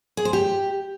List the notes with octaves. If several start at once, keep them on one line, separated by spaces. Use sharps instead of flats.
G#4
C5
G4